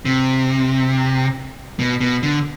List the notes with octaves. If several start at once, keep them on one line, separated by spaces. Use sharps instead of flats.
C3
B2
B2
D3